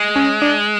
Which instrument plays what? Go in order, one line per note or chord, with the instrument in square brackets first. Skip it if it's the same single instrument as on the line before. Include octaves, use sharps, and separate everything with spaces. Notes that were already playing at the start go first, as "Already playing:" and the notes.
Already playing: [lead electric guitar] G#3
[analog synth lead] C#4
D4